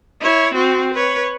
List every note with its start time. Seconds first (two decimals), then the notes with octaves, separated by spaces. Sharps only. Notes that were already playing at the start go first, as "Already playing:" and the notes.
0.21 E4 C#5
0.54 C4 F#4
0.94 B4 C#5